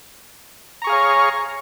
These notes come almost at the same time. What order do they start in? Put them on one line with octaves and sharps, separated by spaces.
A#5 C#6 G#4 F5 C#5